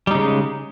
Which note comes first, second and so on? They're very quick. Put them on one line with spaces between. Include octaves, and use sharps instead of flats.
G3 D#4 C#3 G#3